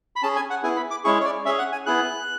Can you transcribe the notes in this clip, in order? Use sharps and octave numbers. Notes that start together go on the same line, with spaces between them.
B5
C#4 G#4 A5
G#5
F#5
B3 E4 G#4 G#5
B5
D6
G#3 C#4 E4 G#4 C#6
C#5
D5
C#4 G#4 E5
F#5
G#5
B3 E4 G#4 F#6